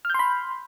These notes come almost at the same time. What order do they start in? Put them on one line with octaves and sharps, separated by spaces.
F6 G6 C6 B5